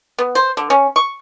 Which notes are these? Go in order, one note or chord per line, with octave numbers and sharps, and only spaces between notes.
B3
C5
D3
C#4
C#6